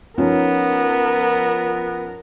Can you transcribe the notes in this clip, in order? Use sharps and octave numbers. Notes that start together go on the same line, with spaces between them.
F3 B3 C#4 D#4 A#4